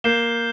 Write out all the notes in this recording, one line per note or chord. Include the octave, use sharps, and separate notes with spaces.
A#3 G6 C7 E7 G7